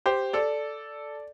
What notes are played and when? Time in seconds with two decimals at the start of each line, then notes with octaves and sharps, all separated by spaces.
0.06 G4 C5
0.33 A4 D5